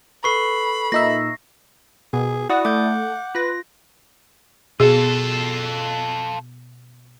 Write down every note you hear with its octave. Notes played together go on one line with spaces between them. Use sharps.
A4 B4 B5 C#6 C7
A#2 D#4 E5 A#6
B2 G#4
E4 F#4 D5 F#5 D#6
A3 D6 G6
F4 B4 A#6
B2 F4 G#4 A4